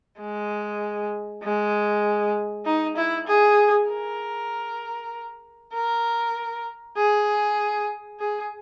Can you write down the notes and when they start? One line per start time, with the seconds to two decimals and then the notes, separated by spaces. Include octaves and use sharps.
0.20 G#3
1.43 G#3
2.65 D#4
2.97 E4
3.27 G#4
3.89 A#4
5.74 A#4
6.97 G#4
8.20 G#4